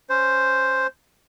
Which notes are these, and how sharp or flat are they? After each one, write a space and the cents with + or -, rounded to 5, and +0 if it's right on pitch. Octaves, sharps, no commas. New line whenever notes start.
C#4 +0 C5 +0